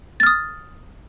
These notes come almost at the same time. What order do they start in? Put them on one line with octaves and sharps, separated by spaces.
A6 F6 D#6